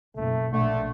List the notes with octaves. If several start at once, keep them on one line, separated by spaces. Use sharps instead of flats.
F#1 B2 A3
A#1 D3 A3